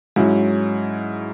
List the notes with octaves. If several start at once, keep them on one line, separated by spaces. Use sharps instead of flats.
G#2 F#3 C#4 E4